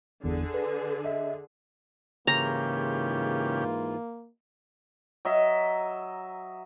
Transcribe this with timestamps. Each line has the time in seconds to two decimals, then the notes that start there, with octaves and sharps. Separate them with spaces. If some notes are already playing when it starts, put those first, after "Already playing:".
0.24 G1 E2 D3 G#4
0.54 B4
1.05 D#5 E5
2.27 G#2 C#3 E3 A#3 F4 G4 A#5
5.25 F#3 D#5 E5